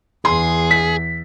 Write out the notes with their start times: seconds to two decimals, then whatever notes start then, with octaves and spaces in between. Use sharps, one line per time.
0.25 E2 G#4 C6
0.71 B6